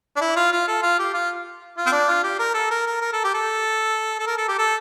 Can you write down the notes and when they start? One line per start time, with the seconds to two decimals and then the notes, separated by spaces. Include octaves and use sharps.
0.16 D4
0.21 E4
0.36 F4
0.52 F4
0.67 A4
0.82 F4
0.99 G4
1.14 F4
1.77 F4
1.86 C4
1.92 D4
2.08 F4
2.23 G4
2.39 A#4
2.54 A4
2.71 A#4
2.87 A#4
3.01 A#4
3.13 A4
3.24 G4
3.34 A4
4.19 A4
4.26 A#4
4.38 A4
4.48 G4
4.58 A4